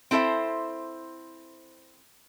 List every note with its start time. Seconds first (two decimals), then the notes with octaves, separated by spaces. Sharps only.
0.11 C4 E4 A4 C5 E5